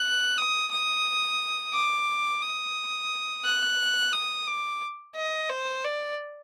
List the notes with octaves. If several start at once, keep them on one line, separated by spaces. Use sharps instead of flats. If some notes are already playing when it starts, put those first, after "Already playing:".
Already playing: F#6
D#6
D#6
D6
D#6
F#6
D#6
D6
D#5
C5
D5